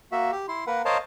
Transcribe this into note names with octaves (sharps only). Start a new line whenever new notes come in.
A#3 F#4 E5
G4
E4 C6
A#3 A#4 B4 F#5
A#4 C5 C#5 D#5 F5 A5